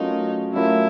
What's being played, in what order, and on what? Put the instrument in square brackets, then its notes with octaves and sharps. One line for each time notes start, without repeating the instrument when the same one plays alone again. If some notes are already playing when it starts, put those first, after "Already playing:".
Already playing: [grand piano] F#3 A3 C#4 F4 A#4 [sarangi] D#4
[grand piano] F#3 A3 C#4 F4 A#4 [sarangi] E4